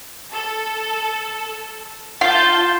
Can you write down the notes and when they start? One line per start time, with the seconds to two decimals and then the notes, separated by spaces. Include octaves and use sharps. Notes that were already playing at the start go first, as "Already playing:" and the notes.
0.33 A4
2.21 F4 A5 G6 A6